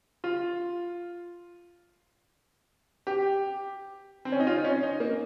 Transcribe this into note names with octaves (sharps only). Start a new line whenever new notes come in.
F4
G4
C4
C#4
D#4
F4
C#4
D#4
A#3